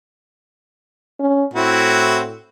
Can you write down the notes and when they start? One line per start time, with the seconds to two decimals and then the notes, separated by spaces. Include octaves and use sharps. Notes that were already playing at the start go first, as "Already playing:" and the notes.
1.20 C#4
1.54 A2 C4 E4 F#4